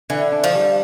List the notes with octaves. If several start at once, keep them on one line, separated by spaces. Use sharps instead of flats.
D3 E3
D4
F3
G3